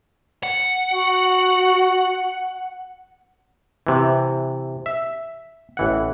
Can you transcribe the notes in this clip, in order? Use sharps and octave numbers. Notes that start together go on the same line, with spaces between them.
F#5
F#4
C3 E3
E5
A1 E3 F#5